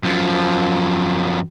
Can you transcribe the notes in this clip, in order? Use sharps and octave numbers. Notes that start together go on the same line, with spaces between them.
F#2 F3